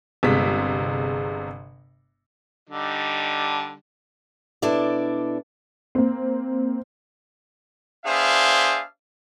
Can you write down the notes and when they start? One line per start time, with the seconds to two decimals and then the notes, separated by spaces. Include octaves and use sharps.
0.23 G1 C3 G#3 B6
2.70 D3 G3 D#4
4.62 B2 D4 E4 A4 D5
5.95 A#3 C4
8.05 B3 D4 G#4 C5 E5 F5